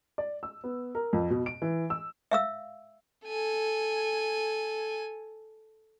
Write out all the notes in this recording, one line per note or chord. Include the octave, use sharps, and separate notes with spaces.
D5
E6
B3
A#4
F2
B2
D7
E3
E6
E5 F5 E6
A4 G#5